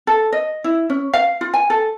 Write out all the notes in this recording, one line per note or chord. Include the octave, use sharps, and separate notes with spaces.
A4
D#5
E4
C#4
F5
F4
G#5
A4